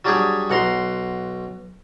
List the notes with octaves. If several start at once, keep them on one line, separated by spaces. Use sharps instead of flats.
F#3 G3 D4 G4 G#4
B1 F#5 A#5 C6